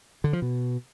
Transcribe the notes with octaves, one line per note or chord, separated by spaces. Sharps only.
D3
F3
B2